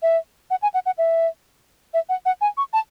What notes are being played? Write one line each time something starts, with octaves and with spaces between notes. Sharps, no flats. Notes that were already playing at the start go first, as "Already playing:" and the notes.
E5
F#5
G#5
F#5
F#5
E5
E5
F#5
F#5
G#5
C#6
A5